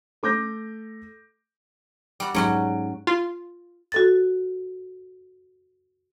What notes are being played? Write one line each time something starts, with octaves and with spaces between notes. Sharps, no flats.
A3 D6 G6 A#6
G3 F#4
G#2 F#3 C#4 F#4 D7
F4
F#4 A4 A6